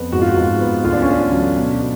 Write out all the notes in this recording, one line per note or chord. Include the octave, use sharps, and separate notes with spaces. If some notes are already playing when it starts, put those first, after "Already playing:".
Already playing: F2 B3
G#2 F#4
F4
F#4
G#2
B3
D2 F4
D4
C#4
D2 D4
F#3
B2
B2